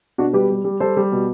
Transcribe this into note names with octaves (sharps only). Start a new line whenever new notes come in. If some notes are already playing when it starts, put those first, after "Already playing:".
B2 D4 F#4
G3 G4 B4
G3
G3
G3 A4 C5
G3
B2